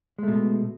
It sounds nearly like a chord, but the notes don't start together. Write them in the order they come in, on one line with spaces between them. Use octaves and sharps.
G#3 A3 B2